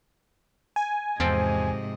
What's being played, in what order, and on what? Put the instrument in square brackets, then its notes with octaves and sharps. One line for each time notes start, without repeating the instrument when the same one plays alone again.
[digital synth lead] G#5
[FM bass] E2 [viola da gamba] G#2 C3 D#5 [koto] F3 C4 A4